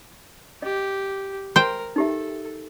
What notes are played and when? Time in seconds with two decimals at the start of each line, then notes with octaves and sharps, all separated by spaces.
0.62 G4 D#5
1.56 A#4 C5 G5
1.96 D#4 G4 A4 E5